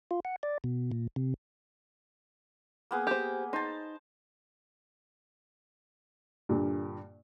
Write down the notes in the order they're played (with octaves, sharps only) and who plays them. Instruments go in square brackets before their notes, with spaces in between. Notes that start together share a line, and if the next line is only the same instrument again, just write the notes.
[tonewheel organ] F4
F#5
D5
B2
A#2
C3
[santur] A#3 B3 G#4
[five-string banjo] G4 C5
[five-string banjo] D#4 [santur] C5 A5
[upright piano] G2 A#2 D3